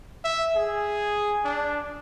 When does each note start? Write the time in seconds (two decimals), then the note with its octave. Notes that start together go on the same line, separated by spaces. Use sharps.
0.24 E5
0.56 G#4
1.45 D4